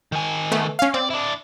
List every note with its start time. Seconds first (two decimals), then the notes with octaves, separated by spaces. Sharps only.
0.12 D#3 G#5
0.52 A3 B3
0.79 C#4 F5
0.94 C4 D5
1.10 D4 E4